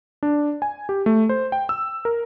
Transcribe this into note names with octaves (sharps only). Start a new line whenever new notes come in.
D4
G#5
G4
A3
C5
G5
E6
A#4